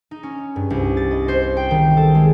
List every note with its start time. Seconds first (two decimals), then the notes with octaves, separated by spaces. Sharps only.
0.11 D#4
0.23 C#4
0.56 G2
0.70 C2
0.97 A6
1.11 D#5
1.28 C5
1.57 G5
1.71 D#3
1.97 A4
2.15 G#3